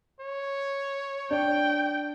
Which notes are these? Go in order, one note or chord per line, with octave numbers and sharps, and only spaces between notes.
C#5
D4 G5